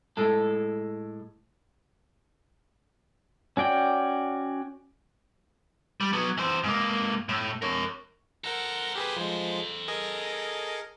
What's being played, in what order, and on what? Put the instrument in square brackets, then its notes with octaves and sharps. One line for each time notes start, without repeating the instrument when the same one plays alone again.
[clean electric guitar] A2 G#3 A4
[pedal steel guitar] C#4 F#4 D5 G5
[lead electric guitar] G3
F#3 B3
E3 C5
G#2 A#3
A2
A#4 C#5
[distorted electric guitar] A4 C5 [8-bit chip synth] A#4 F#5 A#5
[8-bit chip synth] G4 G#4 B4
F3 G#3
G#4 A#4 D#5